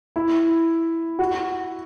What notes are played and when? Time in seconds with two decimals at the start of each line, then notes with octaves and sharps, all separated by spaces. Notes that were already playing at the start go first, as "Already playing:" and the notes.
0.16 E4
1.19 F#4